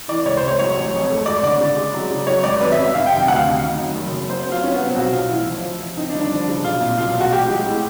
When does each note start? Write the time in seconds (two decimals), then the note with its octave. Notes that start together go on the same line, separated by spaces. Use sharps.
0.08 E3 D5
0.25 C#2 C#5
0.37 C5
0.42 C#2
0.48 C#5
0.59 F#3 C#5
0.77 A1
0.93 F2
1.10 A3
1.26 G#1 D5
1.43 D3 D5
1.61 C#3
1.77 G#3
1.94 F#3
2.10 C#3
2.27 F#3 C#5
2.44 G#1 D5
2.61 F#2 B4
2.72 E5
2.78 F#2
2.84 E5
2.95 D#3 F5
3.06 G5
3.11 C3
3.18 G5
3.28 D2 F#5
3.36 F5
3.45 D#3
3.62 D#3
3.79 F#2
3.95 F#1
4.13 F#1
4.30 F#3 C5
4.47 F#3
4.52 F4
4.63 G3 C#4
4.74 C2 B3
4.86 C4
4.96 B1 F#4
5.13 B1 F4
5.29 A1 E4
5.47 F3
5.64 F3
5.80 F3
5.97 D#3 D#4
6.09 D4
6.15 G1
6.20 D4
6.31 F3
6.48 C#3
6.64 B1 F4
6.81 A#2
6.98 B1 F4
7.09 F4
7.15 B1
7.21 F#4
7.32 A1 G4
7.49 G#3
7.66 A2